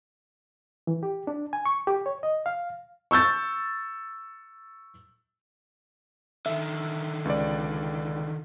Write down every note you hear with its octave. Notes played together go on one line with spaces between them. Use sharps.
E3
G4
D4
G#5
C#6
G4
C#5
D#5
F5
C#6 E6 G6 A6
D3 D#3 E5
C#2 D5